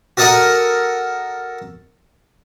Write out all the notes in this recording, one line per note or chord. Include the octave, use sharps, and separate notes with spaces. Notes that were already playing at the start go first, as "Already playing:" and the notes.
F#4 A4 A#4 D#5 F#5